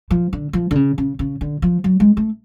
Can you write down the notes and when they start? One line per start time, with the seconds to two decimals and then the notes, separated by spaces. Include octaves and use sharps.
0.11 F3
0.33 D3
0.53 F3
0.71 D3
0.75 C#3
0.98 C#3
1.19 C#3
1.41 D3
1.62 F3
1.84 F#3
2.00 G#3
2.17 A3